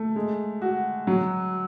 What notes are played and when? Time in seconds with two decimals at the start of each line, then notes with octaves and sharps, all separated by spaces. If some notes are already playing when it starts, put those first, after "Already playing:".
Already playing: A3
0.16 G#3
0.62 F#4
1.07 F#3